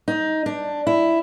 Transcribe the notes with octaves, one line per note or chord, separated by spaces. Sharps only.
D#4
D4
E4